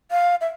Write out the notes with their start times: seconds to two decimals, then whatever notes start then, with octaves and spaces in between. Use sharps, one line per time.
0.11 F5
0.41 E5